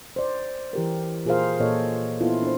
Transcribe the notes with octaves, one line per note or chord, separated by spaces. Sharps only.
C5 D5
E3 G4 A#4
A#2 F4 G#4 A#4 C5 F5
A#2 A4 C#5 D#5
B3 E4 F4 A4
D4 C5